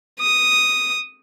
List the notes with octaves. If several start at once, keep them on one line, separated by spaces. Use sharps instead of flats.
D#6